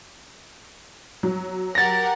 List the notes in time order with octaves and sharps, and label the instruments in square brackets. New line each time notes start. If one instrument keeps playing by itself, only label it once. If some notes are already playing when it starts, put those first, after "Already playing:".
[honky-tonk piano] F#3
[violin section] G4 A#4 F#5 [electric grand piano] A6 A#6